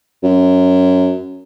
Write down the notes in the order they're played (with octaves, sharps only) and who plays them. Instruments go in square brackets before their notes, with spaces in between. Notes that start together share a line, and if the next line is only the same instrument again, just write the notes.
[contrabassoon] F#2